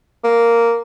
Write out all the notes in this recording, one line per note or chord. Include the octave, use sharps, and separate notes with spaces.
A#3